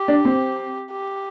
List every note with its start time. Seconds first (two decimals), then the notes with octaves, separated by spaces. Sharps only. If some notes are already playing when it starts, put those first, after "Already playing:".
Already playing: G4
0.08 D4
0.25 C4
0.91 G4